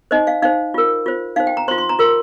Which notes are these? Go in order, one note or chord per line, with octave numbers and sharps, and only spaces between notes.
D#4 C5 D#5
F5
D#4 C5 F5
F4 A#4
F4 C5
D#4 C5 F5
G5
A#5
F4 C5 C6
C6
A#5
F4 A#4 C6